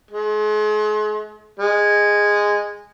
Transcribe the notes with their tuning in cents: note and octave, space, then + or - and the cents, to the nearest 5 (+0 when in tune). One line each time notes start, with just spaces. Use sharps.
G#3 +40
G#3 -10